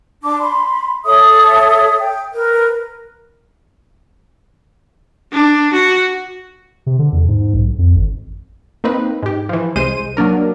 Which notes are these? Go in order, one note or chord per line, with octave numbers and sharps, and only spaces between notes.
D4 A5 D6
B5 C6
A4 C#5 E5 D#6
G5
A#4 B4
D4
F#4
C3
D3
E2
G#2
B1
F2
G#1
A#3 C4 D#4 B4
G#2 G4
E3 F3
C2 G#3 C5 D#7
F#3 A#3 D4 A#4